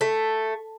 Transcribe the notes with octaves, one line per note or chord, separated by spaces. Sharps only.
A3